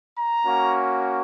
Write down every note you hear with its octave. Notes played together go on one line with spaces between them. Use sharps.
A#5
A#3 C#4 F#4